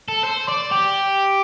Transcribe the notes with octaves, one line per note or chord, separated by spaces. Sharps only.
A4
C5
D5
G4